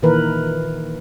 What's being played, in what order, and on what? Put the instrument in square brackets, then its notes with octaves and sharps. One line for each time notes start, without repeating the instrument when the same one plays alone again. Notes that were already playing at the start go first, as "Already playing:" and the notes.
[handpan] A#2 D#3 E3 A#4 B4